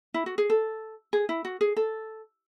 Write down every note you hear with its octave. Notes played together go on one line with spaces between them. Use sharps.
E4
F#4
G#4
A4
G#4
E4
F#4
G#4
A4